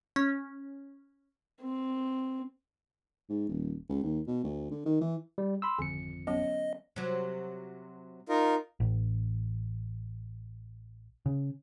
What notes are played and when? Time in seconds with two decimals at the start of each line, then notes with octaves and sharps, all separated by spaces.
0.16 C#4
1.62 C4
3.30 G#2
3.49 D#1
3.89 C#2
4.03 D#2
4.27 B2
4.44 D2
4.71 D3
4.86 D#3
5.01 E3
5.38 G3
5.62 B5 C6 E6
5.79 G#1 F2 D3 C#7
6.27 F#3 B3 C#4 D#5
6.96 C3 F#3
8.29 D#4 F4 A#4
8.80 A1
11.26 C#3